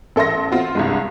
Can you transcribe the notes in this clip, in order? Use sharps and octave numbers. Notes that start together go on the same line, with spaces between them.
A1 A4 E5 C6 A#6
C4 F4 F#4
C2 G2 G#3